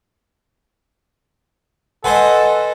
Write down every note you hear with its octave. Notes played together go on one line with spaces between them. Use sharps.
A4 B4 C5 D#5 F#5 G#5 C6